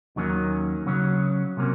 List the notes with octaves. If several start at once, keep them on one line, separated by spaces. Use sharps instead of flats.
D#2 D#3 F#3 A#3 C#4
C#3 F#3 C#4
C3 F#3 A#3 C#4